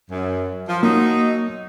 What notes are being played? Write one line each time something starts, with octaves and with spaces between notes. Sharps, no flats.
F#2
F3
F#3 A#3 D#4